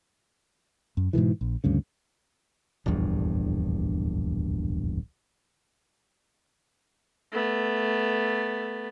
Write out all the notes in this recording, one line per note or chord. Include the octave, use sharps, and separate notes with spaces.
F#2
G#2 B2 D#3 E3
A#1
D2 G2 C#3
D1 A#1 E2 G2
A3 B3